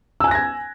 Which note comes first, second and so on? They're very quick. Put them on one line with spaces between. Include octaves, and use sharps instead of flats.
E6 G#5 F#6 A#6 G#6